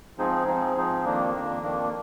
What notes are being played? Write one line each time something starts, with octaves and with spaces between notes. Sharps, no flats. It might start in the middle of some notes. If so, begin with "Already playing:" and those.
G#2 F3 C4 D#4 G#4
G#2 F3 C4 D#4 G#4
G#2 F3 C4 D#4 G#4
F2 D#3 A#3 D4
F2 D#3 A#3 D4
F2 D#3 A#3 D4